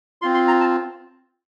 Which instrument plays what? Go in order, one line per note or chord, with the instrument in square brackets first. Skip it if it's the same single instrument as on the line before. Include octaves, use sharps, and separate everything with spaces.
[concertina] C4 F4 C6
C6
A#5
A5